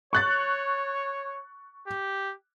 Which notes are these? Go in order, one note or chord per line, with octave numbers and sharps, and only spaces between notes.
C#5 C#6 F#6 A6
G4